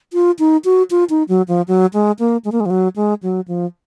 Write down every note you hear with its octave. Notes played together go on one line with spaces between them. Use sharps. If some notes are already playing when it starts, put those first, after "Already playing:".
F4
D#4
F#4
F4
D#4
F#3
F3
F#3
G#3
A#3
G#3
A#3
G#3
F3
F#3
G#3
F#3
F3